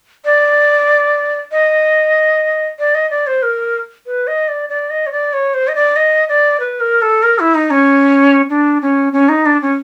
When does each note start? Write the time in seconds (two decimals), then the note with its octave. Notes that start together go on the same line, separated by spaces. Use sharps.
0.25 D5
1.52 D#5
2.79 D5
2.95 D#5
3.10 D5
3.27 C5
3.43 A#4
4.06 B4
4.27 D#5
4.48 D5
4.69 D5
4.90 D#5
5.06 C#5
5.12 D5
5.33 C#5
5.54 C5
5.68 D#5
5.75 D5
5.96 D#5
6.29 D5
6.60 B4
6.80 A#4
7.02 A4
7.23 A#4
7.39 E4
7.55 D#4
7.70 C#4
8.50 D4
8.82 C#4
9.13 C#4
9.29 D#4
9.46 D4
9.62 C#4